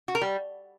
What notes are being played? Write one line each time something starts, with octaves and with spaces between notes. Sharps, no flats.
F#4
A#4
G3